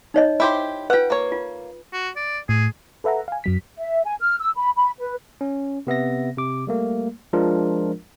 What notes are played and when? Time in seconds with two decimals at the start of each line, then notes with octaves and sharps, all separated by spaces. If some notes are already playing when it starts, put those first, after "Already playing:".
0.14 D#4 C#5 D#5
0.40 E4 G4 C5
0.90 F4 B4 F#5 G5
1.10 A#3 C#5
1.32 F4
1.93 F#4
2.16 D5
2.49 A2 G#4
3.04 A4 B4 E5 F#5 A#5
3.28 F5 G#5
3.44 F#2 F#3 B6
3.77 E5
4.05 G#5
4.20 F6
4.39 E6
4.56 B5
4.77 B5
4.98 B4
5.41 C#4
5.87 C3 B3 E5 A#6
6.38 C3 D6
6.67 G3 A3 A#3
7.33 F3 G#3 D4 F4 A#4